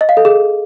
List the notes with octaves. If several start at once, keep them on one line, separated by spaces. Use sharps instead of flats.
D#5
F5
A4
G#4